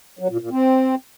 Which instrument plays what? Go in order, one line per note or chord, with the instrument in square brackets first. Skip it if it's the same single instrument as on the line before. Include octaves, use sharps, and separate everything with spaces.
[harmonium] F#3
A#2
A#2
C4